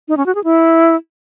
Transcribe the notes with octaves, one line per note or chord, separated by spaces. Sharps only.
D#4
C#4
F#4
G#4
E4